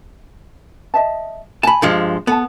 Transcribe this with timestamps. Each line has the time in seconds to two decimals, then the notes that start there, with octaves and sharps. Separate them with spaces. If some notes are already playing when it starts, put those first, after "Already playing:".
0.94 D#5 E5 A5
1.63 G#5 A5 B5
1.82 G2 F3 G#3
2.27 B3 A4 A5